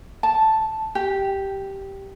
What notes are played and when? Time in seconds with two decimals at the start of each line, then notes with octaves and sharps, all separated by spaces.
0.23 A5
0.95 G4